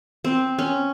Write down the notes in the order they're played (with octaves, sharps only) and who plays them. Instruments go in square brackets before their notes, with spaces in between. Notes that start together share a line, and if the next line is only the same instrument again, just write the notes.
[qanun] C4
C#4